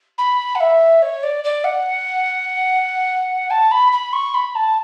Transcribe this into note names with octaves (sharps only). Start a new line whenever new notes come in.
B5
F#5
E5
C#5
D5
D5
F#5
A5
B5
B5
C#6
B5
A5